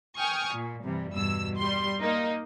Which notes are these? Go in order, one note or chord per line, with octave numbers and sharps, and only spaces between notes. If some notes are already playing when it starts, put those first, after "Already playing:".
G5 G#5 C#6 D#6 F6
A#2
G2 C3 E3 G3
E2 G2 B2 E6
G3 C6
A#3 D#4